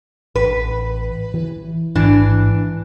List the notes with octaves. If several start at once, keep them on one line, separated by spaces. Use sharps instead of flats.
A1 B4
E3
A1 G#2 E3 D4